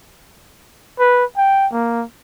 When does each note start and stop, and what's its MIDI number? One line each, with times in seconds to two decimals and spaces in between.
1.00 1.25 71
1.37 1.67 79
1.72 2.04 58